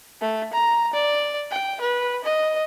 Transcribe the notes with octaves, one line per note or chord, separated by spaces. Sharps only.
A3
A#5
D5
G5
B4
D#5